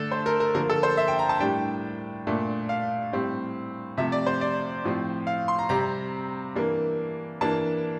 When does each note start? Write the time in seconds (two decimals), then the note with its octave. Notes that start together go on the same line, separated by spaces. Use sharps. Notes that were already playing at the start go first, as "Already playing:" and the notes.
Already playing: D3 A3 D4 A4
0.11 C5
0.26 A#4
0.40 A#4
0.55 D3 F3 A#3 A#4
0.70 A4
0.83 C5
0.97 E5
1.08 G5
1.19 A#5
1.29 A5
1.40 A2 G3 D4 G5
2.27 A#2 A3 D4
2.69 F5
3.12 A2 G3 C4
3.97 C3 F3 A3 E5
4.12 D5
4.27 C5
4.41 D5
4.84 A2 F3 C4
5.27 F5
5.48 C6
5.59 A#5
5.69 C3 G3 C4 A#5
6.55 E3 A#3 D4
7.41 E3 A#3 D4 A5